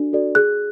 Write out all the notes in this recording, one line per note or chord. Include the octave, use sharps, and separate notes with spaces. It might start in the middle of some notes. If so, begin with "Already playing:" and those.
Already playing: D4 F#4 A4 D5
F#4 A4 D5
G#4 F#6